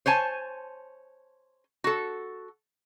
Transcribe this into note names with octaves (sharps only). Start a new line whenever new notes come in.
C5 C#5 G#5 A5
F#4 A4